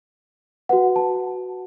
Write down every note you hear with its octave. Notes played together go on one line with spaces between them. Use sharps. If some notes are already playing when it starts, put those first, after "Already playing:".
F#4 B4 F#5
A5